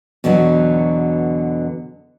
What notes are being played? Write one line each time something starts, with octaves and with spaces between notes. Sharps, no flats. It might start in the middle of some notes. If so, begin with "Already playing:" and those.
E2 B2 D3 E3 F#3